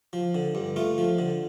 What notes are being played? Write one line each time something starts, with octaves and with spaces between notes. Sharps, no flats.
F3
D3
G2
A3 F4
F3
D3